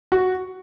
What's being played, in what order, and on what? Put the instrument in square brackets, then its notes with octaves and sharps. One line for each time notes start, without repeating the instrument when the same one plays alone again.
[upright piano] F#4